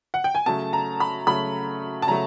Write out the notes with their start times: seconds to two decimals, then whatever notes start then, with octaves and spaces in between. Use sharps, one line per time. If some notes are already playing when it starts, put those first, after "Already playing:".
0.14 F#5
0.24 G5
0.35 G#5
0.46 C#3 F#3 A3 A5
0.73 A#5
1.00 B5
1.27 C#3 F#3 A3 B5
2.02 A5
2.07 C#3 F#3 A3 A#5